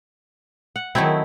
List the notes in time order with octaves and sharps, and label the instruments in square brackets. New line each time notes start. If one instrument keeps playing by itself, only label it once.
[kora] F#5
[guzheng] D#3 A3 C#5 [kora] F#3 C4 E4